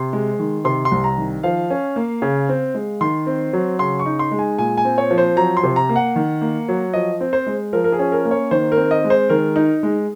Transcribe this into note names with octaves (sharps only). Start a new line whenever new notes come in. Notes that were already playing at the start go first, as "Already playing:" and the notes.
Already playing: C3 C6
G#3
D#3
C3 C6
C6
C2
A#5
D#3
F3 F5
C#4
A#3
C#3
C4
G#3
D#3 C6
C4
F#3
C#3 C6
C#6
D#4
C6
G#3
G#5
A#2 G#5
G#5
C4
C#5
F3
C5
F#3 A#5
C6
C3
A#5
A#3
F#5
D#3
A#3
F#3
F3 D#5
C4
C5
G#3
F3 A#4
A#4
G#4
C#4
A#4
A#3
C#5
D#3 C5
A#4
C4
D#5
G#3
C5
D#3 A#4
D#4
G#3